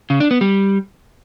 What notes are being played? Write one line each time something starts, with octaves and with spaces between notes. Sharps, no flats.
C#3
D4
B3
G3